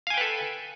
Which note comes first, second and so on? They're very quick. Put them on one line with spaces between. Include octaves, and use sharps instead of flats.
F5 G#5 G5 B4 A4